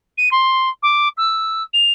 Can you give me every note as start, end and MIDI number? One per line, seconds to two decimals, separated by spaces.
0.17 0.29 99
0.31 0.69 84
0.82 1.08 86
1.17 1.63 88
1.73 1.93 101